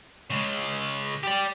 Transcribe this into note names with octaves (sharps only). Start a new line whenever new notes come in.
C#3 G#3
G4 D5